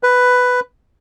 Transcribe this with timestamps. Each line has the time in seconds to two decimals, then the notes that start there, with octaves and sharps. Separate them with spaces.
0.03 B4